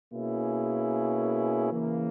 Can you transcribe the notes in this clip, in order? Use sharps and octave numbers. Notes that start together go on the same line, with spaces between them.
B2 A#3 C#4 E4 G#4
C#3 E3 A#3